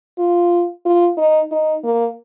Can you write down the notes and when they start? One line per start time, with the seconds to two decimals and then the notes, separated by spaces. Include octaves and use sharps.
0.18 F4
0.85 F4
1.17 D#4
1.52 D#4
1.84 A#3